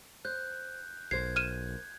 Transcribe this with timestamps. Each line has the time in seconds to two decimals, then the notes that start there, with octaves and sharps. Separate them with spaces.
0.25 C5 F#6 G6
1.11 B1 A#4 C5 G#6 C7
1.36 F6 D#7 E7